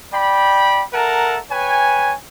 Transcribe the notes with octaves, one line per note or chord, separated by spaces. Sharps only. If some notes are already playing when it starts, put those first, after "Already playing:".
D5 G5 B5
A4 A#4 E5 F#5 A5 A#5
B4 C#5 G5 G#5